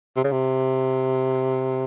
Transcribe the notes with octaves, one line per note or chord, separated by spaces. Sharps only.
C3
C#3
C3